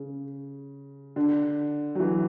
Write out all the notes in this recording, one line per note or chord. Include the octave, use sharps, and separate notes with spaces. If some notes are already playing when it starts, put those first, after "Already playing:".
Already playing: C#3
D3
F#3
E3